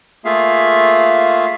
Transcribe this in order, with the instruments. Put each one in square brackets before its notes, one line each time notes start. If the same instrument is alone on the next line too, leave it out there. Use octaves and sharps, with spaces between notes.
[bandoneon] A3 A#3 F4 G#4 E5 F5